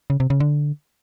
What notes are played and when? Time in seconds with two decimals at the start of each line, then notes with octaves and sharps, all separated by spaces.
0.10 C#3
0.20 C3
0.30 C#3
0.40 D3